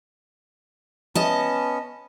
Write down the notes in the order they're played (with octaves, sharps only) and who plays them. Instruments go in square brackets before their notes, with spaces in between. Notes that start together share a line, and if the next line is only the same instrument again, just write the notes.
[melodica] B3 C#4 [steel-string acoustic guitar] D#5 A5